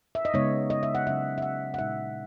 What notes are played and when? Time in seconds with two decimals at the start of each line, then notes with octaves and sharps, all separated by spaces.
0.15 E5
0.25 D#5
0.34 C#3 G#3 B3 D#4 C#5
0.70 D#5
0.83 E5
0.95 F#5
1.07 C#3 F#3 C#4 E5
1.38 E5
1.42 F#5
1.74 F#5
1.78 A#2 G#3 D#4 E5